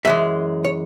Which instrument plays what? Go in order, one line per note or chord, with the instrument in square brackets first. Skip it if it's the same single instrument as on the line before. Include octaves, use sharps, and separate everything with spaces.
[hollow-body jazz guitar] F#2 E3 G#3 E5
C#5